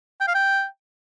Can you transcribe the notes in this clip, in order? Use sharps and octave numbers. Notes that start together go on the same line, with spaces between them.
G5
F5
G5